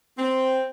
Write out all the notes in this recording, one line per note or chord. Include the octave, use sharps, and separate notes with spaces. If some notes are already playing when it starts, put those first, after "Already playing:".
C4